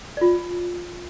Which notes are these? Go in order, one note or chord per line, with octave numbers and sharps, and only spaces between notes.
F4 D5